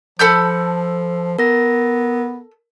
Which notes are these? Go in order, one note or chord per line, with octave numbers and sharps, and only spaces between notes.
F3 A4 B5 G6
B3 A#4 A#6